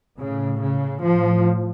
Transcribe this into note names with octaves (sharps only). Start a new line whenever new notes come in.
A2 C#3
C#3
A2 F3